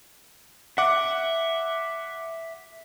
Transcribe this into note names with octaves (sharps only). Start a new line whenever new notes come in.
E5 F#5 D6